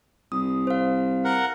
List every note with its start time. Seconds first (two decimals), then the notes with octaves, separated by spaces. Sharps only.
0.32 C2 D#6
0.67 C5 F5
1.25 A#4 F#5